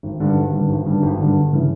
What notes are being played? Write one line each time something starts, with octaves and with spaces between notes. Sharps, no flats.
G#1
G2 D3
G#1
G2 D3
G#1
G2 D3
G#1
G2 D3
G1
C#3 E3